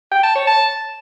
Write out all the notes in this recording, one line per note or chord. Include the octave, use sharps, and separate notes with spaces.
G5
A5
C#5
A5